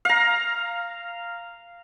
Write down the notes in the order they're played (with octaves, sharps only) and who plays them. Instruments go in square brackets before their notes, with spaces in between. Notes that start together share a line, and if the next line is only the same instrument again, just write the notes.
[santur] F5 A#5